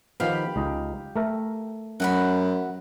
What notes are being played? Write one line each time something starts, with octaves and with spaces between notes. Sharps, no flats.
D#3 F3 B3 G4 F5 B5
C#2 D#4 D#5
A3 A#4 E5
F#2 F#4 F#5 B5